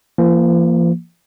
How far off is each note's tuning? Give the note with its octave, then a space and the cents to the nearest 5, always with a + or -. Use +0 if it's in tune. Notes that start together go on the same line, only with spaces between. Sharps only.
F3 -45 A#3 -5